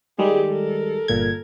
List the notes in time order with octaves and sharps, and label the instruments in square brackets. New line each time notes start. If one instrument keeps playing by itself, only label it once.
[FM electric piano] D#3 G3 G#3 [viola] G4 G#4
[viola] A4 A#4
[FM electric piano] G1 A#2 G#6